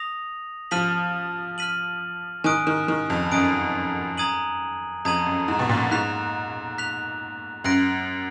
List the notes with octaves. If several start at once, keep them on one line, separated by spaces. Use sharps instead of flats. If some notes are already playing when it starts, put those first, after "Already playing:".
Already playing: D#6 A#6 F7
F3 F6 B6 D#7 F#7
F6 B6 D#7 F#7
D#3 G#5 D#6 F#6 D7
D#3
D#3
F2
F#2 G#5 D#6 F#6 D7
A#5 D#6 G#6 D#7 F#7
F2 A#5 D#6 G#6 D#7 F#7
F#2
G#2
B2
A#2
G#2 F#6 B6 F7
F#6 B6 F7
F#2 F#6 A#6 D7